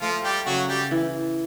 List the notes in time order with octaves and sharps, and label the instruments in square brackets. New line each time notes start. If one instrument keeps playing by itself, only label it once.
[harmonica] F3 F4 [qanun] A3
[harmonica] G3 G4
[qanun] C#3 [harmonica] F#3 F#4
[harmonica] G3 G4
[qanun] E3